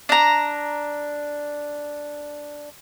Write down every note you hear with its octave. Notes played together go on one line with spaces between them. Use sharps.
D4 A#5